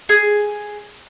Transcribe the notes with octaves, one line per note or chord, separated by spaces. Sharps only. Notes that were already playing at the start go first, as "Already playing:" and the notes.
G#4